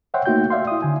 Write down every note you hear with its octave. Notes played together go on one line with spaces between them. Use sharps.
C5 C#5 E5 F#5 G5 C6
A3 A#3 D#4 F#4 G5 G6
D5 E5 F5 C6
E4 D#6
D3 G#5